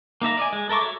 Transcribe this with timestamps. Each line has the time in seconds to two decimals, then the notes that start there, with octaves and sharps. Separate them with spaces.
0.22 A#3 D#4 E5 A#5
0.37 D5 D#5 G#5
0.53 G#3
0.69 A4 A#4 E5 C#6 D6
0.81 F#4 A4 C#5 E5